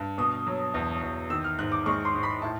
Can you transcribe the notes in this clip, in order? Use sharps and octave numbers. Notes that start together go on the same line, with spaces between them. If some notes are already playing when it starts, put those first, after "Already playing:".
Already playing: G2
B2 D#6
F#3
E2
E2
D#3 E6
F6
G#2 F#6
D6
G#3 C#6
C6
G#2
B5
A2 A5